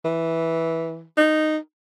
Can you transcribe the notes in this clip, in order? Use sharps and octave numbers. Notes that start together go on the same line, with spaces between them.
E3
D#4